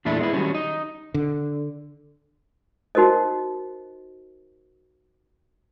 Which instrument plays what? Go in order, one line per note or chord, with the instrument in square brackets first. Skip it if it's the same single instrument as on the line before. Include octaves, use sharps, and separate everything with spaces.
[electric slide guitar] E2 A#2 A3 D4 E4
G#3 B3 D#4 E4
D#3 F#3 G3 C#4
D#4
[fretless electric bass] D3
[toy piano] D#4 F#4 A#4 C5 D#5